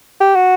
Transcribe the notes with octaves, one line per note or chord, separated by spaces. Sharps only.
G4
F#4